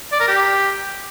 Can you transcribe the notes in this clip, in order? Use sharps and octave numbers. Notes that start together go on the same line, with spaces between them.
D5
A#4
G4